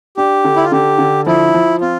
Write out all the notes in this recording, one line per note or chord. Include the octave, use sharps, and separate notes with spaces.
D4 G4
D3
E4
F4
D3 G4
D3
F3 E4
F3
C4 F4